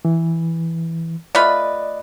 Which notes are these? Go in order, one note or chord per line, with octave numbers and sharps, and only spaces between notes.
E3
A3 F4 B4 D5 D#5